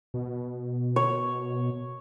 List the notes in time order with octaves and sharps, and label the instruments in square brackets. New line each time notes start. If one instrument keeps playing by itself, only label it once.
[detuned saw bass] B2
[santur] C#5